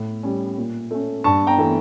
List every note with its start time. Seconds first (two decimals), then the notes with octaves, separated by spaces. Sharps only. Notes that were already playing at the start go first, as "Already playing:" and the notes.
Already playing: A2
0.23 G3 C#4
0.57 A#2
0.91 A3 C#4
1.24 G2 A5 C#6
1.47 G5 A#5
1.58 E3 A3